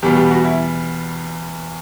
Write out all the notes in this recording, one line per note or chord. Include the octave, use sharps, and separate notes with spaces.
E2 B2 G3 B3 G4
G4
F#4
E4